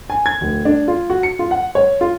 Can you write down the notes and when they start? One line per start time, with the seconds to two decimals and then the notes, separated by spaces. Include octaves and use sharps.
0.10 G#5
0.26 G#6
0.41 D1
0.65 D4
0.88 F4
1.10 F#4
1.23 C#7
1.39 F4
1.51 F#5
1.75 C#5
2.01 F4